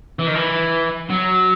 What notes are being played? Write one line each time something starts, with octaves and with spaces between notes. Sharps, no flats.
E3
D#3
E3
F#3